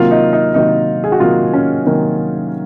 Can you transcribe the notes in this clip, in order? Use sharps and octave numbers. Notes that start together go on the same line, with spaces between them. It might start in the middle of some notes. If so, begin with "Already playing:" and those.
Already playing: C3 D#3 F#3 A#3 F4
D#4
D#4
C3 D#3 F#3 A#3 D#4
G#4
F#4
C3 D#3 F#3 A#3 F4
C#4
C3 D#3 F#3 A#3